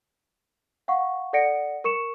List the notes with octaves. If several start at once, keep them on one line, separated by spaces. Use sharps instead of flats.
F5 F#5 C#6
A4 D5 F#5 A#6 C#7 D7
A#4 C#6 C#7 E7